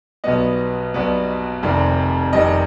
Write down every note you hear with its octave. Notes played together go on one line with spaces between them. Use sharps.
B1 B2 G3 B3 D#5
B1 B2 G3 B3
F1 F2 C3 D#3 G3
F1 F2 C3 D#3 G3 D#5